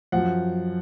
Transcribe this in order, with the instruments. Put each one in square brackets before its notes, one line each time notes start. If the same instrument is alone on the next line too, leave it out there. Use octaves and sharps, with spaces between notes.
[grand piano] F#2 F3 F#5